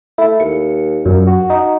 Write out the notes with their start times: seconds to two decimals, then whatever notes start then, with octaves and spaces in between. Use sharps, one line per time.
0.18 A3 E4
0.40 D#2 C#7
1.06 F#2 A#2
1.27 F#4
1.50 D#4